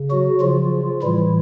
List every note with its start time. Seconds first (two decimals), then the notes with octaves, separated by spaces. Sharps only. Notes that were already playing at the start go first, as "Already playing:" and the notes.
Already playing: C#3
0.11 F#3 F#4
0.41 C#3 F3 F4
1.02 A2 E3 G3 E4